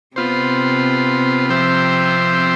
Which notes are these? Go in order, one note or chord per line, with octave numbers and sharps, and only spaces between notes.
C3 B3 F4 C5
F3 C4 G4 C5 E5